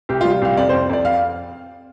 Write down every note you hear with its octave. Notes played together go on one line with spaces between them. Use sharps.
C2 G4
F4
G3
C2 F5
F2 D5
C5
F2
F2 D5
F5